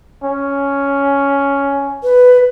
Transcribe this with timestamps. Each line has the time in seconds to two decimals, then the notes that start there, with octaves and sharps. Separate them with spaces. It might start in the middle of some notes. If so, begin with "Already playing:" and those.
0.23 C#4
2.04 B4